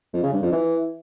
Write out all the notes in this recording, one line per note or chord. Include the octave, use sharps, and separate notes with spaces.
F2
C#3
G2
F2
E3